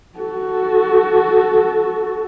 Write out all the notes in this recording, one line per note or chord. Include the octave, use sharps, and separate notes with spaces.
F#4 A4